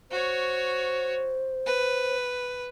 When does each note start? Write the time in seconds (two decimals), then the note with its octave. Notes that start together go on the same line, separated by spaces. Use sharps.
0.11 F#4 C5 C#5
1.66 B4